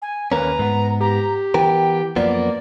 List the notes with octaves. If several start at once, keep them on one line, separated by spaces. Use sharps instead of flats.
G#5
D#2 A#3 C#4 B4 A#5
G#2 B3
G4 A#5
E3 B3 A#4 G5
F#2 F3 A#3 B3 D5